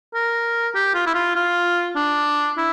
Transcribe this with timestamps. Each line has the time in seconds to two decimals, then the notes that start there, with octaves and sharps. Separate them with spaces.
0.14 A#4
0.75 G4
0.94 F4
1.06 E4
1.14 F4
1.35 F4
1.96 D4
2.57 E4